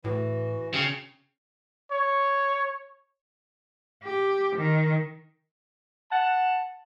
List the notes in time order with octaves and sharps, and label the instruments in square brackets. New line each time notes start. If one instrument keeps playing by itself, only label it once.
[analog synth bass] A2 [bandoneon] E3 [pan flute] F#4
[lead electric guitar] C#3 [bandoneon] G5
[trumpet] C#5
[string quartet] G4
D#3
[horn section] F#5 A5